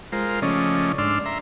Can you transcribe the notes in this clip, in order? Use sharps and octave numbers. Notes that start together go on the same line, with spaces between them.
G#3 F4 A#4 C5
C#3 F3 A3 C#4 D5 D#5
G#2 D4 D5 C6 E6 F6
E5 A#5 C6